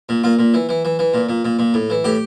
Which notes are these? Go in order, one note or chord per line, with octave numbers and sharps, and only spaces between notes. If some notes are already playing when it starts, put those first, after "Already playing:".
A#2
A#2 F4
A#2
E3
E3
E3
E3
A#2
A#2
A#2
A#2
A2
E3
A2 G4